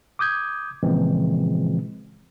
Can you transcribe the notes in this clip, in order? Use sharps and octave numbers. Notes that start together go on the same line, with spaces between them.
D6 D#6 G6 G#6
A#2 C#3 E3 F3 G#3 C4